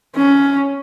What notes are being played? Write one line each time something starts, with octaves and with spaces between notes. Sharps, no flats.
C#4